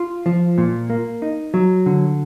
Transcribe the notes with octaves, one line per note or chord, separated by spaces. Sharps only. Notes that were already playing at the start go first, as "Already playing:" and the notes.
Already playing: F4
F3
A#2
A#3
D#4
F#3
D3